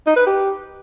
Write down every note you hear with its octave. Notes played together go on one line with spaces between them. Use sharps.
D#4
B4
G4